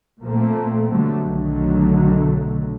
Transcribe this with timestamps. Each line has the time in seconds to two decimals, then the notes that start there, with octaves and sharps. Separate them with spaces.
0.22 A#2 F3 A3 A#3 C4
0.88 B2 D3 F#3 G3 A3
1.23 B1 B2 D3 D#3 F#3 A3